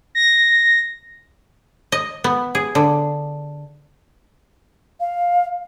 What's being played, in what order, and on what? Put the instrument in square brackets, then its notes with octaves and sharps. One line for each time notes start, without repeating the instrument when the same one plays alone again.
[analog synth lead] A#6
[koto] D#5
B3
G#4
D3
[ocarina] F5